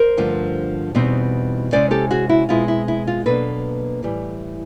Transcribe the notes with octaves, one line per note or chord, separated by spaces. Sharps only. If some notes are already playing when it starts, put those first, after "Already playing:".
Already playing: A#4 C5
G2 D3 F3 A3
E2 B2 G3 C4 D#4
C3 D#3 G#3 C#4 E4 C5 D5
G4 A4
F#4 G#4
E4 F#4
B2 G#3 C4 E4 F4
E4
E4
F4
B2 F#3 A#3 D4 A4 B4
A2 E3 G3